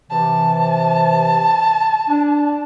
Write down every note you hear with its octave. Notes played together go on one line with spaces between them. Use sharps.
C3 E3 A5
D4